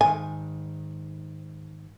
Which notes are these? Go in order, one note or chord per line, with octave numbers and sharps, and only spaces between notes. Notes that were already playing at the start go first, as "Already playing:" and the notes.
G#2 D#3 G#5